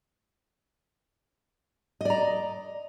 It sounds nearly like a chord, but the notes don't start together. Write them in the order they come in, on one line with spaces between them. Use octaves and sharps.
D#5 D5 A#5